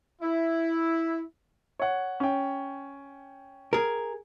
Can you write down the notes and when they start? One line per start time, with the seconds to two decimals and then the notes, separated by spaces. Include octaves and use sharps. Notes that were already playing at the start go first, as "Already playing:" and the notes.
0.22 E4
1.79 C#5 F#5
2.20 C#4 G5
3.73 G#4 A#4